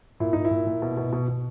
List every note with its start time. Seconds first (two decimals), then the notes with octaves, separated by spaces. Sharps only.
0.20 A#2 E4
0.33 A#2 D#4
0.45 E4
0.51 A#2
0.67 A#2
0.82 B2
0.97 B2
1.13 B2
1.28 B2